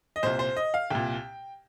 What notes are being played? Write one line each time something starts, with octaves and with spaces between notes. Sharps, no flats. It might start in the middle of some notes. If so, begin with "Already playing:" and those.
D#5
C2 A#2 C5
C5
D#5
F5
C2 A#2 G5